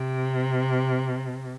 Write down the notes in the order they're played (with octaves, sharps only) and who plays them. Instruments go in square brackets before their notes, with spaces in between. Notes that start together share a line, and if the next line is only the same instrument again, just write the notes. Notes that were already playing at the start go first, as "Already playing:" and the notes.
Already playing: [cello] C3